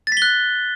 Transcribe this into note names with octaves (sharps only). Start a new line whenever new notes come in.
F#6 A6 B6 G7